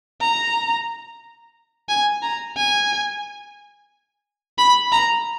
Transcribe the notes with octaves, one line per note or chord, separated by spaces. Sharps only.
A#5
G#5
A#5
G#5
B5
A#5